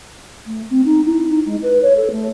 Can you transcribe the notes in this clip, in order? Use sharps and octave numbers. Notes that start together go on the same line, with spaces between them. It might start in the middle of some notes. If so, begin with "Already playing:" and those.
A3
C4
D#4
E4
D#4
G#3
B4
C#5
A4
A3